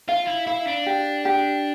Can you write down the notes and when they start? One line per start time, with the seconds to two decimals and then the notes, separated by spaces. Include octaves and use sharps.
0.09 F4 F5
0.27 E4
0.47 E4 F5
0.67 D4
0.86 G4
1.25 G4